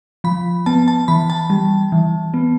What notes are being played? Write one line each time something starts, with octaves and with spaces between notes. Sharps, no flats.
F3 B5
B3 A5
A5
E3 B5
A5
G3
E3
B3